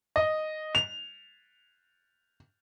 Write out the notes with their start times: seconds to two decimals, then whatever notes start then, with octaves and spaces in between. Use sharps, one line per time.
0.16 D#5
0.75 F7